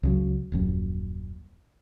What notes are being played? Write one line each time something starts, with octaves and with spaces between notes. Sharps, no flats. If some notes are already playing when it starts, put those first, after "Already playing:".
C#2 C#3 F#3
D#1 A#1 F#2